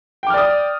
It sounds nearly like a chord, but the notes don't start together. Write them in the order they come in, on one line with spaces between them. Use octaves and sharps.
G5 D6 F6 D5 D#6